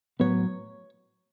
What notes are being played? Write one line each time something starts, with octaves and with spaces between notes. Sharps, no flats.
A2 F#3 B3 C#5